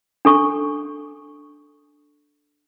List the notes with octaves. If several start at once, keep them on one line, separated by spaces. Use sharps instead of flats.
D4 A4 C#6